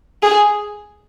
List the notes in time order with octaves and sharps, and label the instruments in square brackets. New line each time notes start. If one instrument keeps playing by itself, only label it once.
[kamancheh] G#4